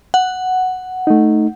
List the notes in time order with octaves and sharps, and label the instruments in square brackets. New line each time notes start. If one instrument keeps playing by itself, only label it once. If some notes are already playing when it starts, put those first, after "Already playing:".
[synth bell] F#5
[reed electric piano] A3 D#4